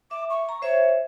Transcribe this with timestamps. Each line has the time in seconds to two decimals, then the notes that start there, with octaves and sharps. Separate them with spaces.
0.11 E5 D6
0.30 C#6
0.49 A#5
0.62 C5 C#5 E5